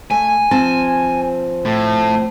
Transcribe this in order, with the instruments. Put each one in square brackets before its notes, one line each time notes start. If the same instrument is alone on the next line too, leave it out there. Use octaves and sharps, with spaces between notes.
[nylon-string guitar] A3 [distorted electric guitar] G#5
[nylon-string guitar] F3 C4 A5
[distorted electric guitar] A2